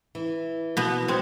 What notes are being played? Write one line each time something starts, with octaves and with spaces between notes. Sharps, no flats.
E3
B2 B3
G#3 B3 C4 F#4 C#5